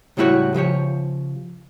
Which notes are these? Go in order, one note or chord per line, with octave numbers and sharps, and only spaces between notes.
C#2 A2 G3 E4 F#4 C#5
C#3 F3 G4 C#5